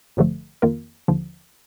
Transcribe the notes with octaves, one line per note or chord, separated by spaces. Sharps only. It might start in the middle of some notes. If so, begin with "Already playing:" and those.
A1 G2 D3 F3 A3
F2 D#3 A#3 F4 A#4
D#2 D3 F3